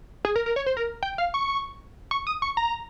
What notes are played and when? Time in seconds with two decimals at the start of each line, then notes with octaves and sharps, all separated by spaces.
0.25 G#4
0.36 A#4
0.46 A#4
0.56 C#5
0.66 C5
0.77 A#4
1.03 G5
1.18 F5
1.34 C#6
2.11 C#6
2.27 D#6
2.42 C#6
2.57 A#5